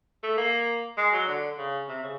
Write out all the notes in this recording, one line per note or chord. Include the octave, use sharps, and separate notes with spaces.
A3
A#3
G#3
F#3
D3
C#3
C3
C#3